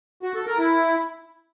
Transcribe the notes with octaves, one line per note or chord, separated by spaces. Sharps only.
F#4
A4
A#4
E4